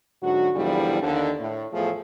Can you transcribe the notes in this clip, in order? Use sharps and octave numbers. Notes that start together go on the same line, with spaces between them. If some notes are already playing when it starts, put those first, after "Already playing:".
G#2 D3 F#3 F#4
E2 G#2 D3 F3 G3 E4
D#2 D3
A2
E2 A2 F3 A3 G#4 A4